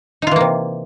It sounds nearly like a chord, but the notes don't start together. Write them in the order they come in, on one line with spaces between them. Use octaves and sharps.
D#4 F4 E3 A#3 C3